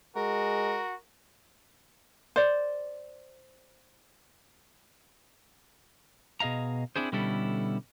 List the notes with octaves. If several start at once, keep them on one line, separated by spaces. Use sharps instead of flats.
G#3 F#4 A#4
C5 D5
B2 G#4 D#5 F5 A#5
C4 D4 E4 G#4 C5
B2 D3 G3 C#4 E4 A4